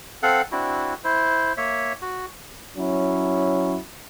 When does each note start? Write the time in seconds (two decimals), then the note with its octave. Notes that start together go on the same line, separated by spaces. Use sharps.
0.23 C4 A4 F5 F#5
0.52 C4 D4 E4 F#4
1.04 E4 C5
1.57 A#3 C#5 E5
2.02 F#4
2.77 F#3 C#4 E4